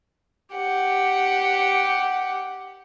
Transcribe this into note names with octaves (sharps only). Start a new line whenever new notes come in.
G4 F#5